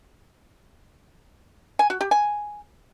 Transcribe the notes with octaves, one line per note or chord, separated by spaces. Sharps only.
G#5
F#4
G4
G#5